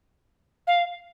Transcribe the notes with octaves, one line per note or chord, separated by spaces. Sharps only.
F5